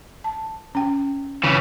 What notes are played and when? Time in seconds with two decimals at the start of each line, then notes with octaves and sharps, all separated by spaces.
0.24 A5
0.75 C#4 G5
1.44 C#3 E3